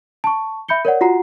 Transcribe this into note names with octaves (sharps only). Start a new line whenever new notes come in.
A5 C#6
E5 B5 G6 C#7 G7
A#4 C#5 D5 F#5
F4 F#4 F#5 A#5 C7